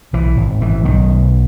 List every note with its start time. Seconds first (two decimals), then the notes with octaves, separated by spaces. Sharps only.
0.13 B1 E3
0.37 G#1
0.61 G#1 E3
0.85 B1 D#3
1.09 B1